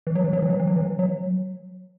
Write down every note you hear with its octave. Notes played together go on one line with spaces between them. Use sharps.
E3
F#3
E3
F#3
E3
F#3
E3
F#3
E3
F#3